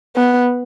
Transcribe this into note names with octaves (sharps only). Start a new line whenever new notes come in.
B3